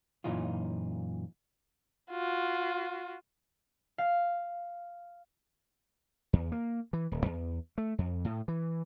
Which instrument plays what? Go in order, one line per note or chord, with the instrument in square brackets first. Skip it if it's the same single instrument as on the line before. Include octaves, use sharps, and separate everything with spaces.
[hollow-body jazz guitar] F#2 A#2 E3 D#4 F4
[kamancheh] F4 F#4
[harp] F5
[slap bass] E2
A#3
E3
D#1
E2
A3
F2
A2
E3